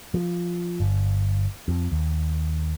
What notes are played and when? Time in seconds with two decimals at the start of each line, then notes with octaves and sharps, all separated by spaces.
0.14 F3
0.80 G1
1.68 F2
1.92 D#2